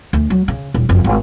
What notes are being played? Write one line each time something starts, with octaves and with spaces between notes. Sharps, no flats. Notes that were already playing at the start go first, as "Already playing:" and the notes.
D2
F#3
C#3
D#1
F#1 F2
G#1